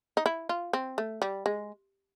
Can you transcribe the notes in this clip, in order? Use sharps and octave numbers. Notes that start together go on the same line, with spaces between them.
D#4
E4
F4
C4
A3
G3
G#3